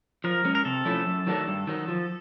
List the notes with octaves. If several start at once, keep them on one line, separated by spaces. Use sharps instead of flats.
F3 A#4
G#3 C#4
A#4
C3 A4
F3 A3 C#4 E4
F#2
D#3 F#3 A3 D4
G2
D#3 F#3
F3